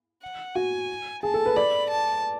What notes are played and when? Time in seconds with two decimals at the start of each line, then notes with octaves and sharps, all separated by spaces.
0.22 F#5
0.55 F#4 G#5
1.23 G#4 A5
1.34 A4
1.46 B4
1.56 D5 B5
1.90 A5